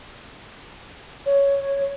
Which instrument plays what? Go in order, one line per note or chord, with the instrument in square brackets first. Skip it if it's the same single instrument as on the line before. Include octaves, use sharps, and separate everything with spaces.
[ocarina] C#5